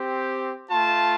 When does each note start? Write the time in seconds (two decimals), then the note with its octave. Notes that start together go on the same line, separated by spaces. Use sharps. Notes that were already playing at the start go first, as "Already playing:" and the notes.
Already playing: C4 G4
0.70 A3 F4 A5